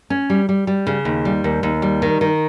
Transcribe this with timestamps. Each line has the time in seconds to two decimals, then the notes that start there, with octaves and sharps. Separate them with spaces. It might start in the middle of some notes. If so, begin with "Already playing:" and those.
0.10 C#4
0.30 G3
0.49 G3
0.67 G3
0.87 C#3
1.05 D#2
1.25 G3
1.44 D#2
1.63 D#2
1.82 G3
2.02 D#3
2.21 D#3